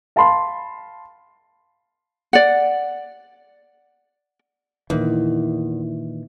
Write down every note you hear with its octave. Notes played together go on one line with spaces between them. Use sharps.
F5 A5 B5 C6
D5 F#5
E2 A#2 D#3 E3